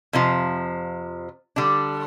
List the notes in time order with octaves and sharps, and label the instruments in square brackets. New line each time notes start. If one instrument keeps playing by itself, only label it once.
[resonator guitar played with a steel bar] F2 C3 F3
D3 G3 D4